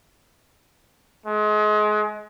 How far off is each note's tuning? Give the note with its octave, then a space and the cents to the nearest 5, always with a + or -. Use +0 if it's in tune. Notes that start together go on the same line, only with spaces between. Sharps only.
G#3 +30